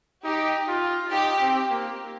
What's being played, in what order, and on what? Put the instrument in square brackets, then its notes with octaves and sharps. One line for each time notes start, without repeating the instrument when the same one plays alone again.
[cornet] D#4 [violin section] G4
[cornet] F4
[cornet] D#4 [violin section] G4
[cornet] C4
A#3